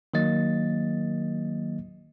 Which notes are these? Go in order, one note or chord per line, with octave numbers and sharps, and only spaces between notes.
D#3 F#3 A#3 D#5 A6